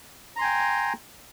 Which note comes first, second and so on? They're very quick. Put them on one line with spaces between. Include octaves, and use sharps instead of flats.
A#5 C6 G#5 G5